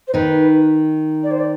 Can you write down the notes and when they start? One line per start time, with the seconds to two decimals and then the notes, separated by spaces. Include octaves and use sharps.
0.07 C5
0.14 D#3 D#4 B4
1.23 D5
1.31 C5
1.39 D5